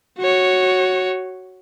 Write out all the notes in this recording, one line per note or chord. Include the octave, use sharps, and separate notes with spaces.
F#4 C#5